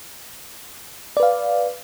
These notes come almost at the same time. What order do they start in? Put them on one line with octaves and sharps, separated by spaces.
D5 B4 F5